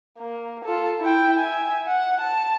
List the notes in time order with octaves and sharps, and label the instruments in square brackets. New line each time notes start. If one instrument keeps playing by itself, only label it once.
[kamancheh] A#3
F4 A4
E4 G5
E5 G#5
F#5
A5